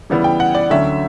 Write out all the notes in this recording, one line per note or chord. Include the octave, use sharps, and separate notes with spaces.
C#3 E3 G3 B3 E4
G5
F#5
D5
D2 D3 F#3 A3 C#4 E5